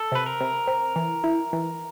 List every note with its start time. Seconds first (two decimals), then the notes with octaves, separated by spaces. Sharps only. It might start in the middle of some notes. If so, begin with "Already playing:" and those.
Already playing: A4
0.12 C3 B4
0.26 A#4
0.41 C3
0.67 C4
0.96 E3
1.24 E4
1.53 E3